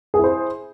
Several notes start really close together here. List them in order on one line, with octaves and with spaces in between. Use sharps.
G#4 E4 C5